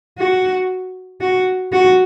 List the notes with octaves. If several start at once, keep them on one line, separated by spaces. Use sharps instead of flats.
F#4
F#4
F#4